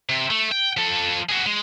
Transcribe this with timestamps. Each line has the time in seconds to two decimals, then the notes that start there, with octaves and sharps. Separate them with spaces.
0.09 C3
0.30 A3
0.52 G5
0.77 F3 A4
1.29 F#4 G#4
1.46 G#3